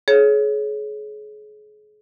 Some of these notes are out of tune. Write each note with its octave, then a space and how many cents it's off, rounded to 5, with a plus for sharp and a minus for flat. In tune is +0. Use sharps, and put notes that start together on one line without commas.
G#4 +35 C#5 +0